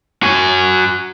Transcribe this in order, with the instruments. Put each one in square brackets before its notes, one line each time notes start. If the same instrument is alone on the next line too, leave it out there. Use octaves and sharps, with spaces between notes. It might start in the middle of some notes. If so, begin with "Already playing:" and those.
[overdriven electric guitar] F#4 G#5